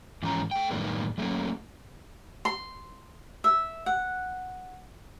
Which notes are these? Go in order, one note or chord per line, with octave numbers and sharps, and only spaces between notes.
G#2 E3 F3 C#4 A#5
A3 G5
F#2 A2 D#3 G3 A#3 B3
F#3 A3 A#3 C#4
C6
E5
F#5